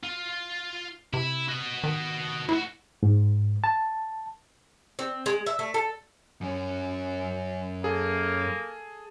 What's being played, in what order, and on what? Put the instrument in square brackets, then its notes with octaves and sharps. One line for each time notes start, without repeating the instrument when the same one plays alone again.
[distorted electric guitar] F4
[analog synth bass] C3 [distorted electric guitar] E4
[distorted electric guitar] F#4 D#5
[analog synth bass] D#3
[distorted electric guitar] D2 F#4 [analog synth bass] E4
[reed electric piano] G#2
A5
[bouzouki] C4
G#3
E5
A3
A4
[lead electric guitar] F#2 C#4
[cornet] A#3 [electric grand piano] G#4 A4